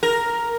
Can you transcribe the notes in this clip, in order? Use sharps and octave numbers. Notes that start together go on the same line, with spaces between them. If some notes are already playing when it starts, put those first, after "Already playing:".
A#4